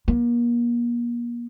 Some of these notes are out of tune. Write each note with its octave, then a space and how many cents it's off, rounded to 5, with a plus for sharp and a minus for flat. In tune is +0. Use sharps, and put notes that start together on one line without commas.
A#3 +35